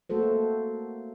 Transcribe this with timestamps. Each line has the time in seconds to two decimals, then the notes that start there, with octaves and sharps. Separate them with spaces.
0.10 A3 A#3 F#4 A4 C5